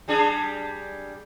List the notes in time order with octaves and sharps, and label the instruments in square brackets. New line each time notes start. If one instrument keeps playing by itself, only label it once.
[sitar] G3 D4 G#4